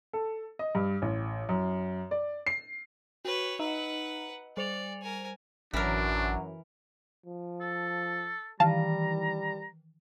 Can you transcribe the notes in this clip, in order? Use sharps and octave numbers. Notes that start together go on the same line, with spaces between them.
A4
D#5
G2
A1
F#2
D5
C7
F#4 B4 C#5
D#4 B4 D#5 F#5 A#5
G3 C5 D5 F7
A#4 G#5
A1 F#2 E3 F#3 D4 A#4
F3
A4
D#3 E3 G3 F5 A5 A#5